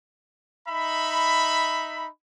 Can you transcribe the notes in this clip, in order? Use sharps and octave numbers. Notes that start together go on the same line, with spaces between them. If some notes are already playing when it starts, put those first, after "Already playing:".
D#4 E5 B5